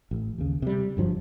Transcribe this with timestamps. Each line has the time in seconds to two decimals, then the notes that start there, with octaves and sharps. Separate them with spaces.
0.11 A1
0.38 D#2 C#3
0.62 C3 G3
0.97 G1 G2 F3 F#3